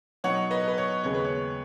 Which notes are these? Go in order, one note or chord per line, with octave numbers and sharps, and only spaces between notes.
B2 F#3 B3 D#4 C#5 F#5
B4 D#5
B4
C#5
D#2 C#3 G#3 B3 C#5
B4
C#5